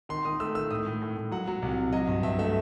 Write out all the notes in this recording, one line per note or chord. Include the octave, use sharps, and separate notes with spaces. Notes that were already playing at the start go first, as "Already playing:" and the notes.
D#3 C6
D#3 D#6
A3 E6
D#3 E6
A2 D#6
A2
A2
A2
F#3 F#5
F#3
C2
C3
F#3 D#5
G2
G2 E5
A3 E5